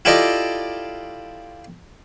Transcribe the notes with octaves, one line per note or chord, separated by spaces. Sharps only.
E4 F4 G4 A4 D5 D#5